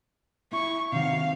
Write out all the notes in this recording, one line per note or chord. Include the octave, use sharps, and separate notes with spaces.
E4 C#6
C3 D#3 F#4 F5